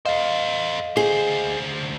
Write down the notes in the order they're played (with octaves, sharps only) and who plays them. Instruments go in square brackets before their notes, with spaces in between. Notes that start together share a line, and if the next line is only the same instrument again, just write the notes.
[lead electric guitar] A4 C5 [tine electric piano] D#5 F5
[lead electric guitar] D2 C5 [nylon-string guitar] G#4